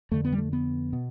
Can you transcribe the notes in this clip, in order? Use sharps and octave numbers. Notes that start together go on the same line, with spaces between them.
F2 D3 A3
B3
G3
A3
B3
B2